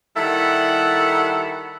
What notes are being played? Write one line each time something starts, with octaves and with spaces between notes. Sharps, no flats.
D#3 G3 E4 A4 F#5